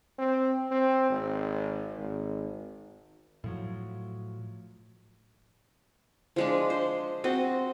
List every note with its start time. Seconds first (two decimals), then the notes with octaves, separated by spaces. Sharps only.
0.19 C4
0.71 C4
1.10 G#1
1.98 G#1
3.44 A2 F3 F#3
6.36 F3 G#3 D4
6.70 C5
7.24 C4 F#4 D#5